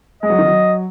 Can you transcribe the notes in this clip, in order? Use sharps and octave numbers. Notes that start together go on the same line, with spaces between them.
G#3 D#5
F#3
D#3
F#3